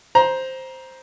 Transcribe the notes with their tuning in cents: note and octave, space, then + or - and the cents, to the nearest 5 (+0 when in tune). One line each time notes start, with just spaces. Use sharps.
C5 +0 A#5 +20